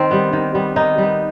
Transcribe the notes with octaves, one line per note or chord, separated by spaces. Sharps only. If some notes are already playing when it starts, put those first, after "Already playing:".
Already playing: D#3 C4
G3 B3
D#3
G3 B3
D#3 D#4
G3 B3